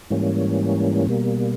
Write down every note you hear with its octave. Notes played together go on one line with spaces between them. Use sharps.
G#2 E3 G3 A#3 C#4
B2 G3 A#3